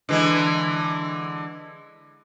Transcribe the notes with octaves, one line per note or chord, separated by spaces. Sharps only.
D3 E3 G#3